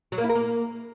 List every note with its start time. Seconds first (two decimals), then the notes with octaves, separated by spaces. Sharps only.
0.12 F#3
0.18 A#3
0.24 E4
0.29 A#4
0.35 A#3